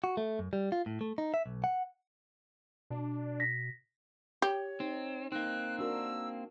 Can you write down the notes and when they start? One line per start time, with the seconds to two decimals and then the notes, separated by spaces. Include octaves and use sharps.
0.04 F#4
0.17 A3
0.39 F#2
0.53 G3
0.72 F4
0.86 A2
1.01 A3
1.18 D#4
1.34 E5
1.46 B1
1.64 F#5
2.90 B2 D4
3.40 A#6 B6
4.42 G4 C#5
4.80 C4 D#4
5.32 A#3 C4 D#4 F#6
5.79 D4 F#4 A#4 E6